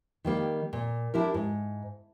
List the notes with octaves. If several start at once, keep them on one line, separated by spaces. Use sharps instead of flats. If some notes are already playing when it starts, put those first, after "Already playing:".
D#3 G3 A#3 D#4
A#2
D4 E4 G4 A#4
G#2